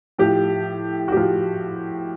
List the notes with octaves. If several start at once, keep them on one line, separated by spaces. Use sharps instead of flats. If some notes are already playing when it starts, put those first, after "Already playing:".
A2 F3 G4
F#4
A2 F3 G4